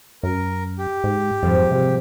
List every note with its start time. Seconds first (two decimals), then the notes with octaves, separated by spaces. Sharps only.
0.23 F#2 A#4
0.79 G4
1.04 G#2
1.43 F2 G#2 F3 G3
1.72 C3